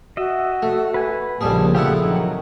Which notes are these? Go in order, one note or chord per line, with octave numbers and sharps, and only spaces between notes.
F#4 D#5 E5
A3
B4 G#5
A#1 F2 C#3 G3 A#3 G#4 A5
F2 A3 E4 G4 G#4 F#5
D#3 F#3